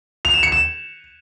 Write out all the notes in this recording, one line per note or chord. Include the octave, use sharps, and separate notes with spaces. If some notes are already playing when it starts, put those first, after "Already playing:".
F7
E7
C#7
E7